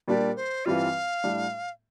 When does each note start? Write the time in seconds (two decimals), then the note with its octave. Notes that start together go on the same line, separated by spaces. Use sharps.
0.08 A#2 G3 A#3 D4 G4 D5
0.36 C5
0.65 G2 E3 G3 C4 F4 F5
1.24 A2 G3 D4